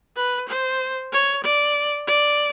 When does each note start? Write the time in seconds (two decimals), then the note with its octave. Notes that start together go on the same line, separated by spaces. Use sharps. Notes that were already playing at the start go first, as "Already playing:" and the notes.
0.16 B4
0.48 C5
1.12 C#5
1.44 D5
2.07 D5